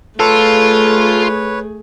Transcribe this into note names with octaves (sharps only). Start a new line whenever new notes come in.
A3 F4 G#4 A4 B4 C#5